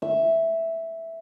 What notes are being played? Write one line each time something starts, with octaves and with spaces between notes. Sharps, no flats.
E5